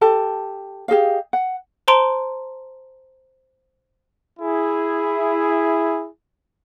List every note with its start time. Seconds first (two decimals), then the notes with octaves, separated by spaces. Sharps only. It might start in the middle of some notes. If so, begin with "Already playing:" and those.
0.01 G4 A4 A5
0.88 G4 G#4 D#5 F5
1.33 F#5
1.88 C5 A5 A#5 C6 D7 G7
4.40 E4 G#4